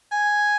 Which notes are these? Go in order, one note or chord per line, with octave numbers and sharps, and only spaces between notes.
G#5